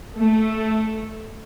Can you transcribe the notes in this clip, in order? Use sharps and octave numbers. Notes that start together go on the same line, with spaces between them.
A3